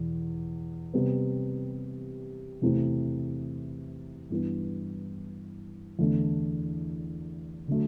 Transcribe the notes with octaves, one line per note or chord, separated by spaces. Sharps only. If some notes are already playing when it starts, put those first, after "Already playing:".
Already playing: E2 B2
C3 G3 B3
E2 C3 E3 A3
G2 E3 B3
E2 D3 A3
D3 F#3 A3